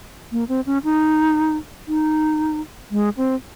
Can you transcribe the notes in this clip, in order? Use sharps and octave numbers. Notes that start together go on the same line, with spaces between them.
A#3
C4
C#4
D#4
D#4
G#3
C4